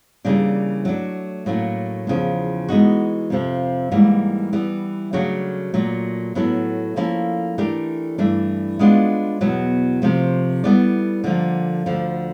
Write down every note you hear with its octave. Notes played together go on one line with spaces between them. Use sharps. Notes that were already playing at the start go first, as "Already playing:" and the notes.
C#3 E3 G3 A#3 D4
F#3 A3 D4
A2 F#3 A#3 C#4
E2 C#3 F3
E3 G#3 B3 D#4 F#4
F2 C3 F3
G#2 E3 G3 A#3
E3 G3 B3
C#3 F#3 A3 D4 F#4
A#2 F#3 A3
A2 F#3 B3 E4 A4
F3 A#3 C#4 E4 A4
E3 A3 D4 G4 A#4
G2 E3 A3 D4
G#3 B3 D4 F4
E2 B2 F#3 B3
C3 F3 A3
G3 B3 E4 A4 D5
D3 F3 A#3
D2 D3 F3